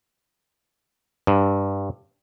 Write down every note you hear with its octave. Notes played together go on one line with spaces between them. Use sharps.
G2